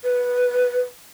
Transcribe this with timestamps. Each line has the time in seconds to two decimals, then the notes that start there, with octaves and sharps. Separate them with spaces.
0.04 B4